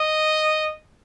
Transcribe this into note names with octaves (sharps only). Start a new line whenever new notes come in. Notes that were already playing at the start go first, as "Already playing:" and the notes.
Already playing: D#5